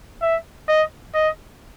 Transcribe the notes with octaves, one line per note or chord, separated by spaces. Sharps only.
E5
D#5
D#5